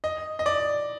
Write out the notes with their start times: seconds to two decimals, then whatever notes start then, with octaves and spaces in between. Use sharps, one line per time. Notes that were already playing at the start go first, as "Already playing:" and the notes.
0.04 D#5
0.39 D#5
0.46 D5